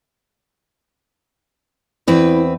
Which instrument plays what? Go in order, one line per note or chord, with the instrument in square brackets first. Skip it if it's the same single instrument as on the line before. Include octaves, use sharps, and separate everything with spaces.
[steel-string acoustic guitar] E2 C4 B4 [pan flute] E4